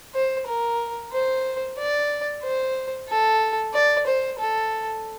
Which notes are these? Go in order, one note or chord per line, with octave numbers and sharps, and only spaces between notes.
C5
A#4
C5
D5
C5
A4
D5
C5
A4